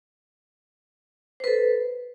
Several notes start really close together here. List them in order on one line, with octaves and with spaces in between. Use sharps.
C5 B4 A4